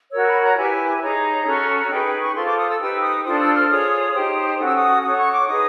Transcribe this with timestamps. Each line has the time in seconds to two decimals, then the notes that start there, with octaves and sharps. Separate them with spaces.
0.12 F#4 A#4 C#5 E6
0.27 B5
0.42 A#5
0.56 E4 G4 B4 G#5
1.01 D#4 G#4 C#5 A#5
1.46 C#4 F#4 A4
1.90 D#4 G#4 B4 G5
2.05 G5
2.21 C#6
2.35 F4 A4 C5 C6
2.46 D6
2.58 D#6
2.69 E6
2.80 D#4 G4 B4 E6
3.02 D#6
3.24 D4 F4 A4 C5 D#6
3.39 E6
3.54 F6
3.69 F4 G#4 C#5 D#6
4.13 D#4 G4 C5
4.58 C#4 F#4 A4 D#6
4.66 E6
4.75 D#6
5.03 F#4 A4 C#5 D#6
5.18 C#6
5.33 D6
5.47 D#4 G#4 B4 D#6